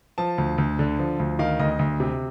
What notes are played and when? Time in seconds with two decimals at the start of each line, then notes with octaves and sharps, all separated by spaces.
0.18 F3 A5
0.38 D2
0.58 D2
0.79 D3
0.99 F3
1.19 D2
1.39 D#3 F5
1.59 D2 D#5
1.79 D2
2.00 C3